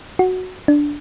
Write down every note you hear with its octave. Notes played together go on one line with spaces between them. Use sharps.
F#4
D4